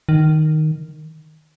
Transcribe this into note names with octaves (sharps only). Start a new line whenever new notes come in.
D#3